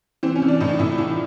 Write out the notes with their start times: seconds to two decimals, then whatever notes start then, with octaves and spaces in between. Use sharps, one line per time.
0.23 E3 C4
0.36 C#4
0.42 E3
0.48 D4
0.60 A2 D#4
0.79 A2 E4
0.98 E3 F4